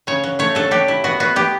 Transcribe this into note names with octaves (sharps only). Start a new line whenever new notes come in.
C#3 C#5
F#3
A3 C#5
F#3 A4
F#3 G4
E4
B3 F#4
B3 F#4
B3 G4